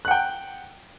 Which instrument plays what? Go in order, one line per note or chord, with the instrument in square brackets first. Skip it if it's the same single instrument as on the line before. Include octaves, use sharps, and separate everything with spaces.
[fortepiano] F#6
F#5
G5